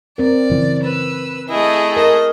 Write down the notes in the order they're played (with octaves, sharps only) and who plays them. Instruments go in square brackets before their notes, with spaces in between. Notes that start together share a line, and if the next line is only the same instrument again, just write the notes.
[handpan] C4 A#4 [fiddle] D5
[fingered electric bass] F#2 C#3 E3
[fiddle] B4 E6
[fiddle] A3 G#4 [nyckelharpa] E4 D#5
[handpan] A#4 [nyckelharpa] D#5